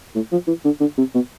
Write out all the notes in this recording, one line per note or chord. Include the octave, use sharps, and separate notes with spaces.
A2
F3
E3
D3
D3
C3
B2